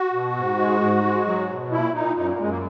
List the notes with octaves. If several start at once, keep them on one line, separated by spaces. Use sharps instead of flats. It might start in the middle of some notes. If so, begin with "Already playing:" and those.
Already playing: F#4
B2
G#2
G#3
G#2
G#3
F#3
B2
A#2 E4
A#2 D#4
F#2 D#4
A#3
F#2 G#3
A#3